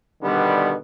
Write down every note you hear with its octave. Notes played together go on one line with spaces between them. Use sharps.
B2 D3 D#3 G3 B3